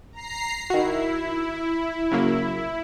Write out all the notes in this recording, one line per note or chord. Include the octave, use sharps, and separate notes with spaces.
A#5 C7
D#3 E4 F#4
C#3 F#3 A#3